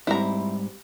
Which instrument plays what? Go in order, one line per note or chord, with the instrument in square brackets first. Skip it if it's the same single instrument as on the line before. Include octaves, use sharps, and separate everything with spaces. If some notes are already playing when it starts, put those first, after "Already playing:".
[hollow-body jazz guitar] G#2 G3 C4 [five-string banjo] E4 A#5